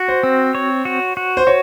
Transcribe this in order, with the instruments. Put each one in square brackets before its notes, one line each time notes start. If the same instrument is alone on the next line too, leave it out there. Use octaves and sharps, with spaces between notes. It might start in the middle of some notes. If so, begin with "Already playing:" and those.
Already playing: [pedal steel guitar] F#4
[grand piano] C5
[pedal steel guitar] C4
C#5
F#4
F#4
[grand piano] C5
[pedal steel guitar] F#4 [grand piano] C#5